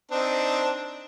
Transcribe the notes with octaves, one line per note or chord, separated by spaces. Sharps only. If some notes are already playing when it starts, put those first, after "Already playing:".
C4 D4 D#4